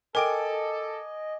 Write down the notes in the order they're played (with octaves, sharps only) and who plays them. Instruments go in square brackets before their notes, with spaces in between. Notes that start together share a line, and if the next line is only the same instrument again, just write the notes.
[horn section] A4 [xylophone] A#4 G5 D7 [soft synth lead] D#5 [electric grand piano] G#5 D6